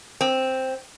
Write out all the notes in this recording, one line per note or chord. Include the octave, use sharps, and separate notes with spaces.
C4